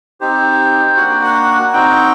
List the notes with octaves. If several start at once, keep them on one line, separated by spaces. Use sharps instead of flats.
C4 D#4 G4 C5
A#3 D4 F#4 F#5
G5
F#5
C4 D#4 F#4 G5